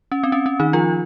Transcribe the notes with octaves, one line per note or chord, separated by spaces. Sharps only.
C#4
C4
C#4
C#4
D#3 D#4
F3 F4